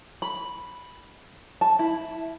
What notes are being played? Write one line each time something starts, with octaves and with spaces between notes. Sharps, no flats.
B5
A5
E4